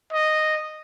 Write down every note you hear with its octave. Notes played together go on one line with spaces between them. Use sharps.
D#5